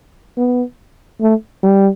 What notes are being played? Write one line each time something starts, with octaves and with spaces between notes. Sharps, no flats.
B3
A3
G3